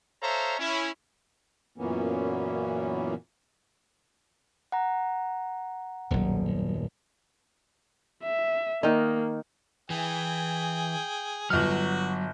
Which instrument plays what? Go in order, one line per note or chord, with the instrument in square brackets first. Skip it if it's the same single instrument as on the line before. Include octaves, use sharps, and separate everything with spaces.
[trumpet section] A4 C5 C#5 E5 F5 A#5
C#4 E4
[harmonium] F#2 A#2 E3 A#3 B3 C#4
[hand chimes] F#5 A#5
[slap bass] D#1 F#2 B2 [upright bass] B1 F#3
[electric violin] E5
[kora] D#3 D#4 [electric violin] A#3
[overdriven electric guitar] E3 [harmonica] G#4 G5
[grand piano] G1 F6 [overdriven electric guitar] F#3 [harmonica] F#4